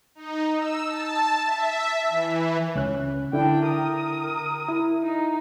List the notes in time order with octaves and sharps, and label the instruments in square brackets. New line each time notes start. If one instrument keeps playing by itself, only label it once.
[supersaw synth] D#4
E6
A5
E5
E3
[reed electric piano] C#2 C#4 F#6
[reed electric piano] D3 E4 [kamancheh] D4 G5
[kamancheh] A#4 D#6
[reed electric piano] E4
[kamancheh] D#4